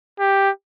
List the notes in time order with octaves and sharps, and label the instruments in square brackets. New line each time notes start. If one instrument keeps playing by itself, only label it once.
[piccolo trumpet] G4